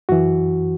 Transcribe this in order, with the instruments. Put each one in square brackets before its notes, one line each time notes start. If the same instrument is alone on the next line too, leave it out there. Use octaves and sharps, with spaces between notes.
[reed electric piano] F#2 E3 F#4